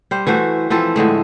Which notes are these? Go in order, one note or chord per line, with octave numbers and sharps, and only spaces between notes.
G3 C5
E3 A3 F#4 C5
E3 F3 C4 A4
A2 D3 G#3 A3